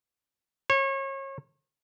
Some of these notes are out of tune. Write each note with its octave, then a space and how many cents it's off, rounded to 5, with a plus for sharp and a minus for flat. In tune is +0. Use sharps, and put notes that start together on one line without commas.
C#5 -30